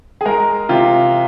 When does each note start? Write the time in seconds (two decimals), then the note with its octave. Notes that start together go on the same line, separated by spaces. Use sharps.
0.21 G#4
0.25 G#3 A#4
0.69 C3 F4